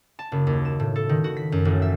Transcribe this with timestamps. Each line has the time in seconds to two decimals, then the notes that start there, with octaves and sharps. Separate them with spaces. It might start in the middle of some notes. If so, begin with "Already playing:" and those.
0.19 A5
0.32 F#1
0.47 D#2
0.65 E7
0.80 A2
0.96 A4
1.09 D#3
1.24 F#4
1.37 B6
1.52 F#2
1.65 A1
1.82 E5